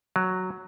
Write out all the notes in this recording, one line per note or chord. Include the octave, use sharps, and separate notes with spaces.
F#3